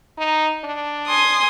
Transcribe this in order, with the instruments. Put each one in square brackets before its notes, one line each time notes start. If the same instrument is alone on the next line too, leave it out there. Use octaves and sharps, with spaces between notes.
[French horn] D#4
D4
[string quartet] G#5 C6 D#6